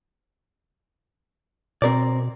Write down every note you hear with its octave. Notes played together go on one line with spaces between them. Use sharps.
B2 C4 A#4 D5